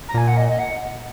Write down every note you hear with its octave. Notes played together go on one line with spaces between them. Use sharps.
A#5
A#2 G#5
F#5
D#5
D#5
F#5